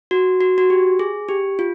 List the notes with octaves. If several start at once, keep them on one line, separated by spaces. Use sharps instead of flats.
F#4
F#4
F#4
G4
G#4
G4
F4